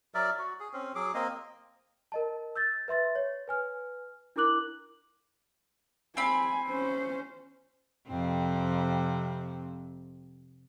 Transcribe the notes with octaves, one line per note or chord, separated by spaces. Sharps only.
F#3 A#4 D5 E5
F#4
G#4
C4 C#4
F#3 G#4 D6
A#3 C4 D#5
A#4 D#5 A5
E6 G6 A6
B4 E5 C6 A6
C#5
B4 G#5 F6
D4 E4 A#4 D6 F#6 F#7
C4 G#5 B5
C#4 C5
F2 C3 C4